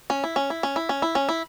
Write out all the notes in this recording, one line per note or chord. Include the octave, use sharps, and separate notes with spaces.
C#4
E4
C#4
E4
C#4
E4
C#4
E4
C#4
E4